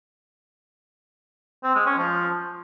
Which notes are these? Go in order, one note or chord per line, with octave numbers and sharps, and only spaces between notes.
C4
G#3
C#4
F3